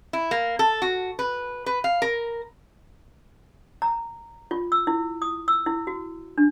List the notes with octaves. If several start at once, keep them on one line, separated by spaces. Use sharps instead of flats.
E4
A#3
A4
F#4
B4
B4
F5
A#4
A#5
F4
E6
E4
D#6
E6
E4
F#4
D4